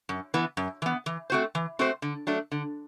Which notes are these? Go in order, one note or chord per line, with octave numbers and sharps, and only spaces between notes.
F#2
E3 B3
F#2
E3 B3
E3
A3 C4 F#4 C5
E3
A3 C4 F#4 C5
D3
F#3 A3 D4
D3